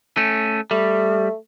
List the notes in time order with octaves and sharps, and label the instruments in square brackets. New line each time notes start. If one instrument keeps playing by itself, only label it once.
[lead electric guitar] A3 C#4
[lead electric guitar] G3 [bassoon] A3